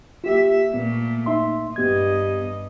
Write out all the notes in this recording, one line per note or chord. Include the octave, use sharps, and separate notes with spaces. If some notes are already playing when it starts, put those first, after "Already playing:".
A#3 F4 G4 E5
A#2 A3 B3
D#4 E5 C6
G2 B3 G4 D#5 G#6